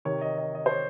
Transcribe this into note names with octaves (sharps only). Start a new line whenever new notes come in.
C3 D#3 C#5
D#5
D#5
D#5
C5
C#5